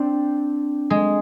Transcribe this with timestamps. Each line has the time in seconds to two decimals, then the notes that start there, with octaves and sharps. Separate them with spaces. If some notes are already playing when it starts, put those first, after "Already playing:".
Already playing: C4 D4
0.90 G#3